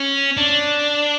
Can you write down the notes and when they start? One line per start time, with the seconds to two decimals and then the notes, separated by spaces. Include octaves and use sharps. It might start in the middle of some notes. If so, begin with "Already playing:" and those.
Already playing: C#4
0.37 D4